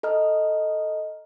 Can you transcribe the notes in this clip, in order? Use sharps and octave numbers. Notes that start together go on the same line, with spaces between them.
A4 D#5 A#5 F6